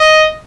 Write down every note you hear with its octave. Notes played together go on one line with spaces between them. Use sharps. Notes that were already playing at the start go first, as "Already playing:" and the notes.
Already playing: D#5